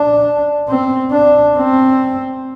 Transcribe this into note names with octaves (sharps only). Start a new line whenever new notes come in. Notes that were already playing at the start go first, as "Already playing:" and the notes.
Already playing: D4
C4
D4
C4